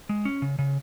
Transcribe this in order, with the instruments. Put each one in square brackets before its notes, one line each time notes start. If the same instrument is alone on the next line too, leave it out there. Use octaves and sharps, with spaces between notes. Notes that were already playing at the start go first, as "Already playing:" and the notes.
[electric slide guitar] G#3
C#4
C#3
C#3